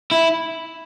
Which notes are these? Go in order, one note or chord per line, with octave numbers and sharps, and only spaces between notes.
E4